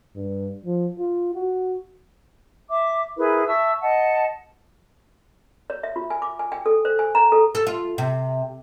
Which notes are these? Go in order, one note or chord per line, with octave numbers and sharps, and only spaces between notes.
G2
F3
F4
F#4
E5 D6
E4 G#4 A#4 B4
E5 A5 C#6 E6
D#5 F#5 A5
C#5
E5
F4
G#5
D6
G#5
G5
A4
C5
G#5
A#5
A4
A4
F4
C3